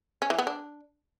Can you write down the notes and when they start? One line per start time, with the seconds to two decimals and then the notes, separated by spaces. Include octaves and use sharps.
0.22 C#4
0.30 E3
0.38 B3
0.47 D4